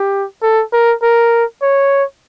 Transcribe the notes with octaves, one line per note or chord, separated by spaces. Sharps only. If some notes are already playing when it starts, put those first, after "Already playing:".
Already playing: G4
A4
A#4
A#4
C#5